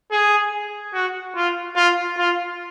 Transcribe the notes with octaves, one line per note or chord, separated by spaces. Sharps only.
G#4
F#4
F4
F4
F4